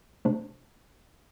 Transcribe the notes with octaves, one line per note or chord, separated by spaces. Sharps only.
C3 A3 D4 C5